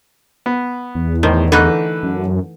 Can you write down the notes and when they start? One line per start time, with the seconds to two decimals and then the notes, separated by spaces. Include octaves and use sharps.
0.46 B3
0.95 E2
1.23 A2 D#3 C5
1.52 D3 E3 A3 D#4 B4 F#6
2.03 F#2